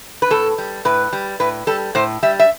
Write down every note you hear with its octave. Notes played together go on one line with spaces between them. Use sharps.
B4
A2 A4
G3
A2 B4
G3
A2 B4
G3 A4
A2 C5
G3 E5
E5